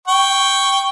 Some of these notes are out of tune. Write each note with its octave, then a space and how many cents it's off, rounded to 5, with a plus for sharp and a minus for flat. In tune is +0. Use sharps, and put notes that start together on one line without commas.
G5 +0 C#6 +0